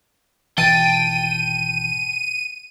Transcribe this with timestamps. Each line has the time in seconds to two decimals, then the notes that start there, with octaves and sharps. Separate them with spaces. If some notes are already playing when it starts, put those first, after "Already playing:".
0.58 G#1 B2 E3 G5 A5 D#7